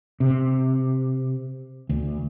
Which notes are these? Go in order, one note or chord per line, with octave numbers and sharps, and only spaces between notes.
C3
D2